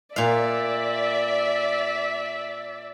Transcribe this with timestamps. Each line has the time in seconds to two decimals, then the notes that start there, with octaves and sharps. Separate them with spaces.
0.16 A#2 D5 E5 F5